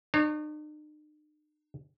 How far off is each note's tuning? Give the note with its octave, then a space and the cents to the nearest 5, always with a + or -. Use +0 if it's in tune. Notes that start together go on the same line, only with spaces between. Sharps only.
D#4 -45 C#5 +0